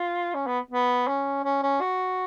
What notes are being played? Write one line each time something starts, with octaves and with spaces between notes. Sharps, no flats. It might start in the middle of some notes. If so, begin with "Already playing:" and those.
Already playing: F4
C#4
B3
B3
C#4
C#4
C#4
F#4